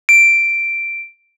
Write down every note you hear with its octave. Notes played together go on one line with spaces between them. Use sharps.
D7